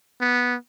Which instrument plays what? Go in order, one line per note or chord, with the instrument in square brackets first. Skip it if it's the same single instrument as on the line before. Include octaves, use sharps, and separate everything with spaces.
[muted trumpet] B3